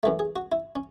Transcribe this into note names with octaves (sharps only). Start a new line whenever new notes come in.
F#2 E3 A3
G#4
F#4
E4
C#4